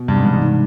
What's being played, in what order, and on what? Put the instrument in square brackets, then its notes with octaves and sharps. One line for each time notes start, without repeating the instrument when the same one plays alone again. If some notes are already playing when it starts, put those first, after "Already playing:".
Already playing: [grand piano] B2
[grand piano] G2 [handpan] C3
[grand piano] G#2
[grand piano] G2 [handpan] E3
[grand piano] G#2
[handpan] D#4